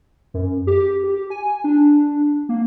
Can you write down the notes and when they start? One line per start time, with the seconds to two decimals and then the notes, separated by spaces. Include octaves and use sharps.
0.34 F#2
0.67 G4
1.04 G4
1.30 G#5
1.64 D4
2.49 A#3